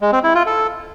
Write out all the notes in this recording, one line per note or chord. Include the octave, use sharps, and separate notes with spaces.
G#3
C4
E4
F4
A4